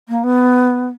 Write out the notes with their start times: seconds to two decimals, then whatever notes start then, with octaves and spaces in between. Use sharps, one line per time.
0.09 A#3
0.24 B3